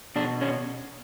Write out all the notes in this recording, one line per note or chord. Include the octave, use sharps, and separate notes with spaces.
B2 D4
C#4